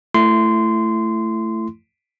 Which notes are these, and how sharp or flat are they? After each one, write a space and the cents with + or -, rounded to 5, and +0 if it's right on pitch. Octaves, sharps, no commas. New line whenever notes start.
A3 +10 E4 +25 C6 -15